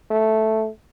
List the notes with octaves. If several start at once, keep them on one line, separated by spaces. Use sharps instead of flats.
A3